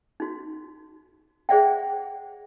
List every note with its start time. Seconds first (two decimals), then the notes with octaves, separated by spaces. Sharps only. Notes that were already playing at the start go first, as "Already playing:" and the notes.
0.20 D#4 F#4
1.49 G#4 C5 D5 E5 F#5 G5